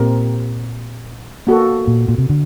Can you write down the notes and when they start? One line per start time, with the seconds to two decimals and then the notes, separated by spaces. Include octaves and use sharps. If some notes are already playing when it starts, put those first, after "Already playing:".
Already playing: A#2 C4 G4 A#4
1.47 A#3 F#4 A4
1.87 A#2
2.08 A#2
2.18 C3
2.29 D3